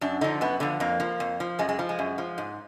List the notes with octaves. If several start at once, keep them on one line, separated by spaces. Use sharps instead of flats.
F#2 D4
D3 F3 D#4
F#2 B3
D3 F3 B3
F2 A#3
F3
F2
F3
F#2 G#3
G#3
F3
G#3
F#2
F3
G#2